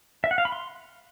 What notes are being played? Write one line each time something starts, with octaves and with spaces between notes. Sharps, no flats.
E5
F#5
F5
B5
C6